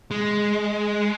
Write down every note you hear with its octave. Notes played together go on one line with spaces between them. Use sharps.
G#3